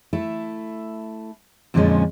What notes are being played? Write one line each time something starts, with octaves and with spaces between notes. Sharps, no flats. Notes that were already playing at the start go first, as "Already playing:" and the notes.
A3 E4 A4
F2 A#2 D3 F3 G#3 C#4